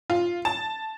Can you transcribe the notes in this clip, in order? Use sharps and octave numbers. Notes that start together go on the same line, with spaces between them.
F4
A5